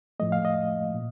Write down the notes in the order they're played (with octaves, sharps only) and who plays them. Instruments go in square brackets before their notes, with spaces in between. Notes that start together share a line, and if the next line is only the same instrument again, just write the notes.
[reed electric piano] A2 F3 A3 D#5
F5
D#5
A#2